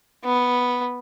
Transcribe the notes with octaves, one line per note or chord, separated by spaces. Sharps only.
B3